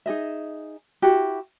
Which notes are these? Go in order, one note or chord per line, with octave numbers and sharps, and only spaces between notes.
D#4 G#4 D#5 E5
E4 F#4 G4